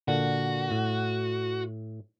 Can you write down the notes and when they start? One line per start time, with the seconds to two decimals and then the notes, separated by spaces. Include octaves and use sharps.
0.08 A#2 D3 F#4 F#5
0.71 A2